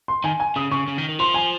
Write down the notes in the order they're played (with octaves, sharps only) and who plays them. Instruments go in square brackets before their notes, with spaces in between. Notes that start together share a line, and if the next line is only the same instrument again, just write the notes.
[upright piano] C6
[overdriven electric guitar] D#3 [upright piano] G#5
[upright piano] G#5
[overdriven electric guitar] C#3 [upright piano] D#6
[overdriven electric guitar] C#3 [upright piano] C#6
[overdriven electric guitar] C#3
D#3
D#3
[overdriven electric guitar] F3 [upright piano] C6
[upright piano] G#5